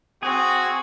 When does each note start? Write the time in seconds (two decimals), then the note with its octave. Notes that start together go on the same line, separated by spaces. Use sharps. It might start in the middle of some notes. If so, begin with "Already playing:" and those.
0.23 C4 F#4 G#4